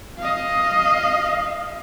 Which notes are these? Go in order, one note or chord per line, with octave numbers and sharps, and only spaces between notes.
D#5 F5